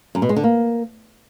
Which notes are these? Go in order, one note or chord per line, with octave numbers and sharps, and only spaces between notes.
F#2
B2
G#3
D3
A#3